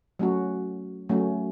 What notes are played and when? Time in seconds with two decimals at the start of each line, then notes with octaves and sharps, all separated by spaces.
0.19 F#3 A3 C#4 F#4
1.09 F#3 A3 C#4 F#4